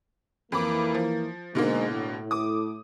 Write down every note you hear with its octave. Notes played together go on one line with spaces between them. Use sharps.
F2 E3 A#3 B5 D6
F3
G#2 B2 D3 A#3
A2
D6 D#6